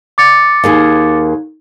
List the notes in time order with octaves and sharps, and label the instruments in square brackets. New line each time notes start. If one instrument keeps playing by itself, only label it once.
[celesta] D6 A6 C#7
[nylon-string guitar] D#2 A#3 G#4